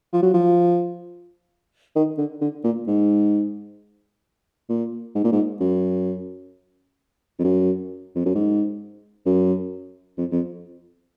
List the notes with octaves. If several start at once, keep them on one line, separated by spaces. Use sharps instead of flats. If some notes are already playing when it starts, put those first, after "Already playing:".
F3
F#3
F3
D#3
D3
D3
A#2
G#2
A#2
G#2
A#2
G#2
F#2
F2
F#2
F2
F#2
G#2
F#2
F2
F2